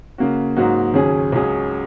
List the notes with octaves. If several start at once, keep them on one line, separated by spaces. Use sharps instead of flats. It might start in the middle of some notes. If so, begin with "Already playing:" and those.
C#3 A#3 F#4
G#2 F#3 A#3 D#4 F#4
D#2 C#3 F#3 C#4 G#4
C#2 C#3 F#3 C#4 G#4